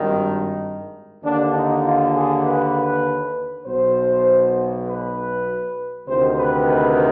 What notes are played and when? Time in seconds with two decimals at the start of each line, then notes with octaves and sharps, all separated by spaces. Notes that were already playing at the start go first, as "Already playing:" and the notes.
Already playing: G#1 G2 D#3
1.23 D#2 D3 D4
1.54 D#4
1.84 F4
2.13 G#4
2.44 B4
3.65 B1 B2 C5
4.86 B4
6.06 D2 C3 D#3 C5
6.36 B4
6.67 B4